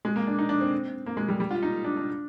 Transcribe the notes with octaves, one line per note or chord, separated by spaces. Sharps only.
G#3
A#3
D4
D#4
D4
C4
A#3
G#3
G3
G3
F4
D#4
D4
D4